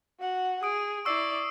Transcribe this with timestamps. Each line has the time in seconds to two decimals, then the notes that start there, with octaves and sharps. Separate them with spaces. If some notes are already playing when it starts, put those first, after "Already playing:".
0.20 F#4 F#5
0.63 G#4 D#6 D7
1.05 E4 D5 C#6 E6 C7